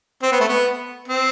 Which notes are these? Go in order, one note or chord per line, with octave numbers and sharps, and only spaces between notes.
C4
B3
A3
B3
C4